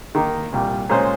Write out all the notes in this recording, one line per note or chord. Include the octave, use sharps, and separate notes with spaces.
D#3 A#3 D#4
C2 A#2 G3
A#2 G#3 C#4 G#4 C5